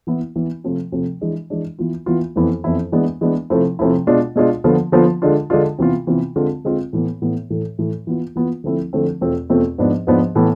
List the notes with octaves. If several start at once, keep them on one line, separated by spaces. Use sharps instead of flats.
E3 B3 E4
E3 B3 E4
C3 F3 A3
C3 F3 A3
E3 G#3 D4
E3 G#3 D4
E3 B3 F4
E3 B3 F4
F2 E3 B3 E4
F2 E3 B3 E4
E3 G#3 B3 D4
E3 G#3 B3 D4
C3 F3 A3 E4
C3 F3 A3 E4
B2 G#3 D4 F4
B2 G#3 D4 F4
D3 F3 B3 F4
D3 F3 B3 F4
D3 G#3 D4 F4
D3 G#3 D4 F4
C3 E3 B3 F4
C3 E3 B3 F4
D3 G#3 C4 F4
D3 G#3 C4 F4
A2 E3 B3
A2 E3 B3
A2 E3 A3
A2 E3 A3
E3 B3 F4
E3 B3 F4
D3 F3 A3 C4 E4
D3 F3 A3 C4 E4
E2 B2 A3 C4 F4
E2 B2 A3 C4 F4
G#2 F3 B3 D4
G#2 F3 B3 D4
A2 E3 B3